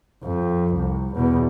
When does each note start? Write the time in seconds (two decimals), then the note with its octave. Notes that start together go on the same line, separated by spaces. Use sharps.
0.23 F2
0.75 C2
1.15 E2 B2